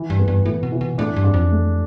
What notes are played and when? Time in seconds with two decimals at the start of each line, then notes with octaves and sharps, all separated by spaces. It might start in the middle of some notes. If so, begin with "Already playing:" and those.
Already playing: E3
0.10 G2
0.19 B3
0.28 G2
0.45 A2 E3
0.63 B2
0.72 E3
0.81 B2
0.98 A2 D4
1.16 G2
1.24 D4
1.34 F2
1.51 A3